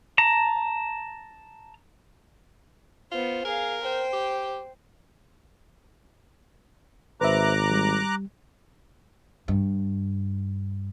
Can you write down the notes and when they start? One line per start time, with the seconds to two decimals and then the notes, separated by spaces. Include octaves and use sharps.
0.18 A5 A#5
3.12 B3 F4 C5
3.45 G#4 A#4 F5
3.81 C5 G5
4.13 G4
7.21 G#1 B4 C5 E5 A#5 D6 F#6
7.71 G3
9.48 G2